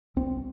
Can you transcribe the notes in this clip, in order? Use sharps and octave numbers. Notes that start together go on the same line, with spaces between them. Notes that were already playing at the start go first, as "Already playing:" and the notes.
C2 C4